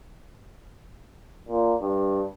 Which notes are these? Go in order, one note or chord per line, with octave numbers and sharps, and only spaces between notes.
A#2
G2